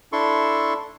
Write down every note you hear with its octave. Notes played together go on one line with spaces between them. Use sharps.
D4 E4 A4 C6 C#6